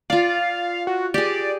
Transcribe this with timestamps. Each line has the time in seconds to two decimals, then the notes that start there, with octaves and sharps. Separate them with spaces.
0.10 F4 D5 F5
0.87 F#4
1.14 G4 G#4 D5